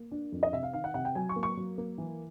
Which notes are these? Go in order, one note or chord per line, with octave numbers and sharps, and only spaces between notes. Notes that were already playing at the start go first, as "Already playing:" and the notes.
Already playing: A#3
D4
F2
D#5
C3 E5
F5
D#3 F5
F#5
C3 F#5
G5
F#3 G#5
C#6
A#3
C#6
F#3
A#3
E3